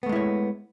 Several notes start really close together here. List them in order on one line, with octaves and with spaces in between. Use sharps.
B3 A3 G#3 E4 C#5